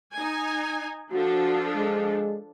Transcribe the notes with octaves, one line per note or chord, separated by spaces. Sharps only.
D#4 G#5
F3 D4 F#4 A4
G#3